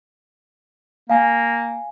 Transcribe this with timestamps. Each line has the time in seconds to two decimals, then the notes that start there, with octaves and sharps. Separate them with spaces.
1.10 A#3 F5 G#5